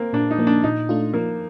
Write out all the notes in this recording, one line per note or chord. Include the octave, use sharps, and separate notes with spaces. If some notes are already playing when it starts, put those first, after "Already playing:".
Already playing: A#3 C4
A#2 D4
D#4
F3 A#3
D4
A#2 D#4
A3 D4 F4
F3 A#3